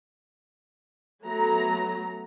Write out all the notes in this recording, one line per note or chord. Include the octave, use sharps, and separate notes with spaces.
F#3 A3 B3 A#5